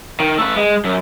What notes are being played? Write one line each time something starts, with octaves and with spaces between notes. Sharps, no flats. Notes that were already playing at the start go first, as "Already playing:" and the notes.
D#3
A3 B4
G#3
F#2